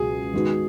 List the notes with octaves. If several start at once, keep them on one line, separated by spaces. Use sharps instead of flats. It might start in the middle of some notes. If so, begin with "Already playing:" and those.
Already playing: C#2 B2 F#3 G#4
D#3 G#3 B3 F#4